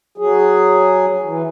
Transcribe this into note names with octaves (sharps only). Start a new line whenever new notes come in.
F#3 G#4
E3